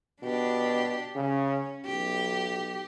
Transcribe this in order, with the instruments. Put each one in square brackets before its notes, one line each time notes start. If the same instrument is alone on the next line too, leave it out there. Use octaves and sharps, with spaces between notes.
[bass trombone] B2 [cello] D4 G4
[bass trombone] C#3 [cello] C#4
[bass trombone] B1 [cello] G4